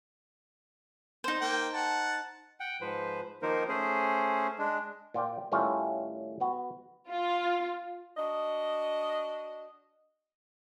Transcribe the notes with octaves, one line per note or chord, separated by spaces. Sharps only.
D#4 C5
A#3 G5
F#5 A5
F#5 G5
G#2 F3 B4 C5
D#3 F3 A#3 D#4 A#4 C5
A3 C#4 G#4 C5
G#3 D4
A#2 F4 D5 G5
A2 D#3 G3 A3 C#4 F4
B3 F#4
F4
D4 F#4 D#5